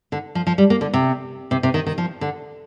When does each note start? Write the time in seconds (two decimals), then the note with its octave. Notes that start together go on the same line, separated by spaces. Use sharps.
0.12 D3
0.35 F3
0.47 F3
0.58 G3
0.70 A#3
0.81 D3
0.94 C3
1.51 C3
1.63 C3
1.74 D#3
1.87 D#3
1.98 F3
2.21 D3